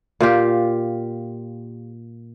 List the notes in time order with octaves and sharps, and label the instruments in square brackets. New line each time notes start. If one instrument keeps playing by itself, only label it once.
[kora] A#2 F4 G4